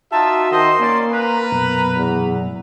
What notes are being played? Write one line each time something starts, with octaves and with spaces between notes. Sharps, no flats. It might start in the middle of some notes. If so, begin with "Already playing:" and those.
D#4 F4 F#4 E5 A5
D#3 C5 D#5 C6
A#3 C#4 D5
A#4 B4 A#5
F#2 B2
E2